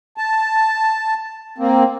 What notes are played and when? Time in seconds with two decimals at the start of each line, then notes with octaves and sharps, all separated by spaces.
0.17 A5
1.58 A#3 C4